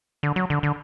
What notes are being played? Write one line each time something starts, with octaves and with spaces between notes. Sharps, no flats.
D3
F#3
D3
D3